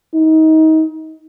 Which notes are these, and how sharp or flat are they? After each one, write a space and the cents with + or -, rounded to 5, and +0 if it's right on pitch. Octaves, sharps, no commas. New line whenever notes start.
D#4 +30